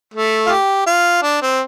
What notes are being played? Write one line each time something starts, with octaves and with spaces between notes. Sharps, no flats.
A3
F4
G4
F4
D4
C4